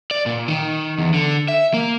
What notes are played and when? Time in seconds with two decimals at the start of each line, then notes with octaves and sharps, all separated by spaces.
0.11 D5
0.26 A#2
0.48 D#3
0.98 E2
1.14 D3
1.48 E5
1.74 A#3